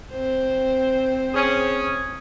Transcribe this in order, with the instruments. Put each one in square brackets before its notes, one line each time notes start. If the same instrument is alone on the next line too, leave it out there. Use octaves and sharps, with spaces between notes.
[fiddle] C4 C5
[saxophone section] C#4 G#4